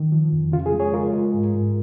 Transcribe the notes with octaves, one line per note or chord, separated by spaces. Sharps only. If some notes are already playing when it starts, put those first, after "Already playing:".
Already playing: D#3
F3
F2
C#3 F4
G#4
G#3
G#4 C#5
G#3 F4 A#4
G#3
G#2
G#2